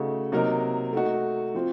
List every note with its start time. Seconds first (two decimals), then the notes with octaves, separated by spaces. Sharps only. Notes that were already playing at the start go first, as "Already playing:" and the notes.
Already playing: C#3 A3 D#4 F#4
0.32 C3 F#3 A#3 D#4 A#4
0.93 A3 D#4 F#4
1.54 F3 C4 F4